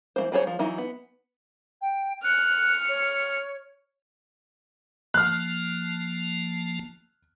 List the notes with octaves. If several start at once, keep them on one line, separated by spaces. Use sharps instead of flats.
E3 A#3 C5
F#3 G#4 C5 C#5
F3
E3 F#3 D#4 E4
B3
G5
F6 F#6 C#7
C#5
F3 A#3 A5 F6 F#6